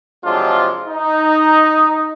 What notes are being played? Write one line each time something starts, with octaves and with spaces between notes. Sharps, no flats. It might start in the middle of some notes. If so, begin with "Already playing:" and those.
C3 F3 F#3 G#3 D4 F4
D#4